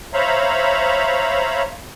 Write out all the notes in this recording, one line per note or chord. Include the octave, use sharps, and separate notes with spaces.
C5 C#5 E5 F5 A#5 B5